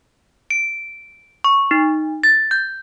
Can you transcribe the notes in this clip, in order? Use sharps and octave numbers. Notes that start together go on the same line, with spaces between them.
D7
C#6
D#4
A6
G6